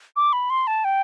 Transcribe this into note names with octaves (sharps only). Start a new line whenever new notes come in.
D6
B5
C6
A5
G5